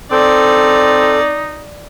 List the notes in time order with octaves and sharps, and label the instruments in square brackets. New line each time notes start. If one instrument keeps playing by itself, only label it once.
[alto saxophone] C4 [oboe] D#4 [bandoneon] A4 [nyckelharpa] D5